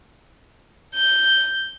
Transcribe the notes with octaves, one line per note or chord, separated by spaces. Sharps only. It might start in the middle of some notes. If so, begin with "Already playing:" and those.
G6